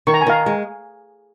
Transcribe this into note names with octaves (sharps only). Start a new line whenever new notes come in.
D#3 C#6
A#5
G#5
D#3 F5 A#5
G#3